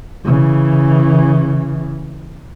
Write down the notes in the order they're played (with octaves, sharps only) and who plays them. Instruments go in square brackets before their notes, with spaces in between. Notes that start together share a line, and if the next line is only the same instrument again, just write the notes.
[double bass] C#3 E3